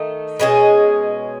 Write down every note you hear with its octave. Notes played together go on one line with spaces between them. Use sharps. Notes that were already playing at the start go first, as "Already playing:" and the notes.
Already playing: D#3 A3 D#4
B2 G#3 C#4 G#4